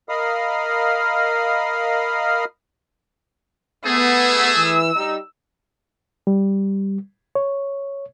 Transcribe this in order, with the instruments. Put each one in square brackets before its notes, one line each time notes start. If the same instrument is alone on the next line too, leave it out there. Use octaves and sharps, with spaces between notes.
[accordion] A#4 D#5 F5 B5 D#6 F6
[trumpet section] A3 G#4 [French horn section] B3 [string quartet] E6
[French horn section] E3
G3 D#4
[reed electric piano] G3
C#5